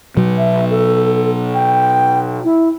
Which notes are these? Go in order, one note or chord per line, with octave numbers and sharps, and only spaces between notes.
B2 F#3
E5
A4
G5
E4